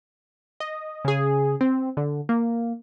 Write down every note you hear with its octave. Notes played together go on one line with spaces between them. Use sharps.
D#5
C#3 G#4
C4
D3
A#3